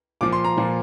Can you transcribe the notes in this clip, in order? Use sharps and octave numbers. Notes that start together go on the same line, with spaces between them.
A#2 F3 D6
C6
A#5
A#2 F3